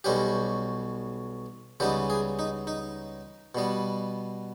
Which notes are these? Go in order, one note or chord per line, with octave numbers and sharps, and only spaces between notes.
B1 B2 G3 C#4 G4
C#2 C#3 G3 B3 D#4 G4
G#4
D#4
D#4
B2 G3 B3